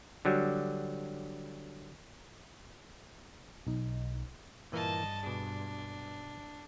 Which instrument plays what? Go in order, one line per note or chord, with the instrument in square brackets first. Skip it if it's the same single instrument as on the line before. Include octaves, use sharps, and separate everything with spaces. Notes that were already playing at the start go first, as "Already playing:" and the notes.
[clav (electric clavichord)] D3 F#3 G3
[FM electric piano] B1 D#4
[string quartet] G2 [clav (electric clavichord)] A#2 E3 A#3 [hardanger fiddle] D#5 A5
[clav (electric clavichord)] B2 G#4 [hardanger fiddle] D4